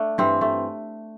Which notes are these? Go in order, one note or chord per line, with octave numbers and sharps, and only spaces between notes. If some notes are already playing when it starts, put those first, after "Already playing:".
Already playing: A3 D4
G2 E3 G3 C4
A3